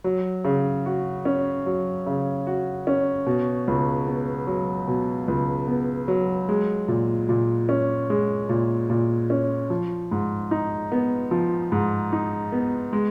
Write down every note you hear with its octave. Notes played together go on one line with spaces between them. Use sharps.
F#3
C#3
F#4
C#4
F#3
C#3
F#4
C#4
B2
C#2
B3
F#3
B2
C#2
B3
F#3
G#3
A#2
A#2
C#4
G#3
A#2
A#2
C#4
F3
G#2
D#4
B3
F3
G#2
D#4
B3
G#3